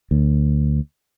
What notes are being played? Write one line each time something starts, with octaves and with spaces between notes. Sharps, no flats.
D2